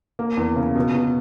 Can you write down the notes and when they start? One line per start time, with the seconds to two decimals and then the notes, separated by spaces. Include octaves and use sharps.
0.19 A#3
0.37 E2
0.56 C#3
0.75 B2
0.95 B2